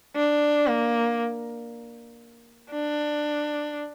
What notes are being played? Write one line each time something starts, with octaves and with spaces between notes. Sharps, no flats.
D4
A#3
D4